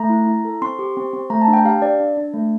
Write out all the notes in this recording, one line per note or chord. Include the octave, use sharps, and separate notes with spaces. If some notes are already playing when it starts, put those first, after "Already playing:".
Already playing: A3 A#5
E4
E4
A4
C4 C6
G4
C4
C4
A3 A#5
A5
D4
G5
G4 F5
D4 D5
D4
D4
A3